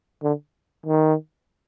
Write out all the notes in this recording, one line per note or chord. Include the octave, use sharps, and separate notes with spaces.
D3
D#3